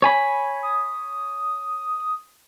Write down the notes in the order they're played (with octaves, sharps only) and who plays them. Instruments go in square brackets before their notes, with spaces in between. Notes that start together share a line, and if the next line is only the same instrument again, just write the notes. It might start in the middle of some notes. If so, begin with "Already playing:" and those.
[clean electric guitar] C#5 G#5 B5
[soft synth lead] D#6